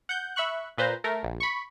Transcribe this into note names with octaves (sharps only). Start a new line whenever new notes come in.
F#5 G6
E5 B5 C#6 F#6
A#2 B4 C5 A#5
A3 A#4
A#1
B5 C#6